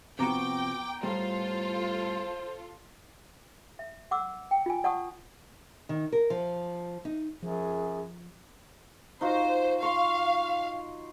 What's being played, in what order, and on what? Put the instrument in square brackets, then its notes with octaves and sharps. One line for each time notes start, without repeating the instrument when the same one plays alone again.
[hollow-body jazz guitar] C3 F3 F#4 [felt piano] B3 A#5 [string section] G5 [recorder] D6
[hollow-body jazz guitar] A2 G3 [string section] F4 A4 [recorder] C5
[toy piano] E5
F#5 D6 E6
G5
F4 G#5
D5 F#5 A5 C#6 D#6
[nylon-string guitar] D#3
A#4
F3
D#4
[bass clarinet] F#2 [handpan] F3 [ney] G#4
[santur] D#4 F4 F#4 [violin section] C5
[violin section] F5 [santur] C6 C#6